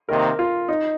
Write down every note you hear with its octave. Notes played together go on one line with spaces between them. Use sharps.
C3 D#3 A#3 D#4 A#4 C5
F4
D#4